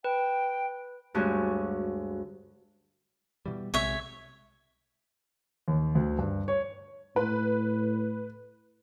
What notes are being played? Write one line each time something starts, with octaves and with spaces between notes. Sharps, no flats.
B4 G5
D2 G2 G#3 C#4 F#4
B2 E3 G3
B1 C3 G#3 C#5 E5
D#2
D2
G2
C#5
A2 B4